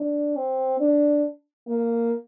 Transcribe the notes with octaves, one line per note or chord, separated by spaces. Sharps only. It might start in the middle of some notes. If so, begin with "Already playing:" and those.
Already playing: D4
C4
D4
A#3